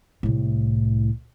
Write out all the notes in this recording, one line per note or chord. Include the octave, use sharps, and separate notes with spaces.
C2 A2